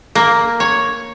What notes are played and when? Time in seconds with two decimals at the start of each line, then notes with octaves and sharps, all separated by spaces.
0.15 A#3
0.60 C#5